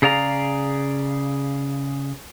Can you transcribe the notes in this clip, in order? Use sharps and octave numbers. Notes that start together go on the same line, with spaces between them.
C#3 G#4 D5 F5 A#5